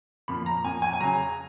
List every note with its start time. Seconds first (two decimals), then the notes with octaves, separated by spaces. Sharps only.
0.28 A#2 F3 B5
0.46 A#5
0.64 A#2 F3 G#5
0.82 G#5
0.93 G#5
1.01 C#3 F#3 A#5